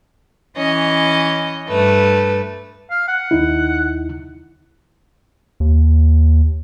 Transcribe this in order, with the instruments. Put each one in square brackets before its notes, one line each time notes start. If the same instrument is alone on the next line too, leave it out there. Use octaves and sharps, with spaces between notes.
[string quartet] E3 C#4 D#5
G2 A3 B4
[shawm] F5
F#5
[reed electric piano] D#2 D#4 E4
[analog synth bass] D#2